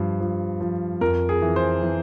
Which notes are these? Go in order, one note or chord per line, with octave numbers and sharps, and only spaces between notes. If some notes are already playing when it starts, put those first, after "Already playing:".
Already playing: G2 F3
F3
F3
F2 A#4
G#4
E3
C5
E3